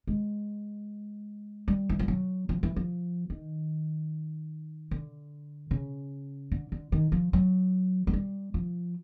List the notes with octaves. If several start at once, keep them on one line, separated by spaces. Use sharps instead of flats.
G#3
G3
E3
F3
F#3
F3
E3
F3
D#3
D3
C#3
D3
D3
D#3
F3
F#3
F#3
G3
F3